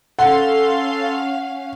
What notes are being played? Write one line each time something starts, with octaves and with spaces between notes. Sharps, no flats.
C#4 A4 F5 F#5 C6 C7